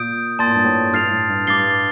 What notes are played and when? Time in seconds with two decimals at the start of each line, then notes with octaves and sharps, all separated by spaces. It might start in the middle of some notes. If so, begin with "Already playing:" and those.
Already playing: A#2 D#6 G6 D7
0.39 A#2 A5 C6 D#6 A6
0.47 A2
0.56 G2
0.64 A2
0.93 G2 F6 A6 C7 F7
1.11 A2
1.29 G2
1.47 G2 D6 A6 C7 G7